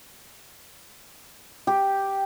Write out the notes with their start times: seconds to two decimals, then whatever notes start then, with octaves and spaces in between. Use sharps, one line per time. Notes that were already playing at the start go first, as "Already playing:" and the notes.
1.67 G4